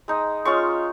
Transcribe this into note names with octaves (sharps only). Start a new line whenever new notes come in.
G#3 D#4
G#3 C#4 F4 C#6